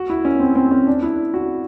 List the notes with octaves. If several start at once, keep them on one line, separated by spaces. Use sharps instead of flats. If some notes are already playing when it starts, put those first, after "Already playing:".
Already playing: F#4
E4
C#4
C4
C4
C#4
D4
E4
F#4